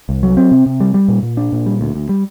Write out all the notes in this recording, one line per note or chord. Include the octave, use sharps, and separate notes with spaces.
C2
F#3
C4
C3
C3
G3
G3
A#2
A#2
D4
A#2
G3
D2
D2
G3